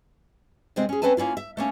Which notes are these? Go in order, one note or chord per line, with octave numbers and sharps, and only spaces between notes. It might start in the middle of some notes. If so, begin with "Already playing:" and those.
C3 G#3 C4
C#4 G#4
C4 C#4 B4 E5 G#5 A5
A#3 C#4 E4 F4
E5
A3 A#3 C#4